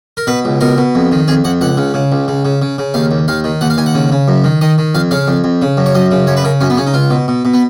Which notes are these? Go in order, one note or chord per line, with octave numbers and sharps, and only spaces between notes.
A#4
B2 B4
C#2
B2 A#4
B2
F2
D#3
F2 G#4
F2 F#5
C#2 F#5
C#3
C#3
C#2
C#3
C#3
C#3
C#3
D#2 F5
D#2
D#2 F5
D#3
D#2 F#5
F5
D#2 G#5
F#5
C#3
C#3
F#2
D#3
D#3 D#5
D#3
F2 F5
C#3 F5
F2
F2
C#3
F#2
C#5
F#2 D#5
C#3
F#2 C#5
B4
C#3 A#4
F#2 C#4
B3
C#3 C#4
D#4
C#2 F4
B2
B2
B2
B3